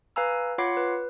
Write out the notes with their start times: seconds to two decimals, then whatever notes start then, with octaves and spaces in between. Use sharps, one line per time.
0.16 B4 F5 G#5 A#5 E6
0.58 F4 C#5 F#5 B5 D6 C7
0.77 B4